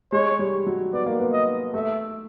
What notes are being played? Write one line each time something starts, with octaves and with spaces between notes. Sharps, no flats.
G#3 C#5
G3
F#3
B3 D5
A#3
B3
D#5
A3 E5